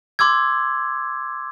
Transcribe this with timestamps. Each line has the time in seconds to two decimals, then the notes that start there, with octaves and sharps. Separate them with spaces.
0.19 C6 D6 E6 G#6